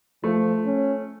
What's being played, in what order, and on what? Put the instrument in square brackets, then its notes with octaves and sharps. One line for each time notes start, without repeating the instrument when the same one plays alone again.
[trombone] F3 [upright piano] A3
[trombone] C#4